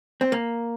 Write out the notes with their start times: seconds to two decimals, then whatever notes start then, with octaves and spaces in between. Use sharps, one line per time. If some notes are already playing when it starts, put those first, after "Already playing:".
0.21 C4
0.32 A#3